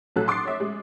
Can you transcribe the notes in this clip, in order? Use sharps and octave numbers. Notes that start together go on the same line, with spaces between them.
B1 A2 F#3 A4 F#6
C6 D6 D#6 A6 C7
C#5 E5
G#3